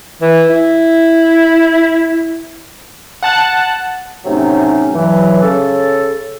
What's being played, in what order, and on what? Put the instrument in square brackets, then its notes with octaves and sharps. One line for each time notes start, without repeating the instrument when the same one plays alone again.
[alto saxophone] E3
E4
[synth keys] F#5 A5 F#6
[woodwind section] A2 C3 F#3 A3 C#4 D#4
G2 E3 F#3
C#3 A4